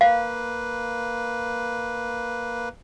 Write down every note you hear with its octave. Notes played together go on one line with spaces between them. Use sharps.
A#3 B4 F5